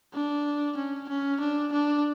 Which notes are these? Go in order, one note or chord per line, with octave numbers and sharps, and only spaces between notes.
D4
C#4
C#4
D4
D4